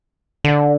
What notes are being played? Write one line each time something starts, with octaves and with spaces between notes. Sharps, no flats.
D3